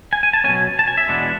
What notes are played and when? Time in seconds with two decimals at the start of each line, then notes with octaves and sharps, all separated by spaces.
0.13 G#5
0.23 G#5
0.33 A5
0.44 A3 C#4 G#5
0.48 B2 F#3
0.79 A5
0.88 G#5
0.98 E5
1.08 E2 B2 G#3 B3 D4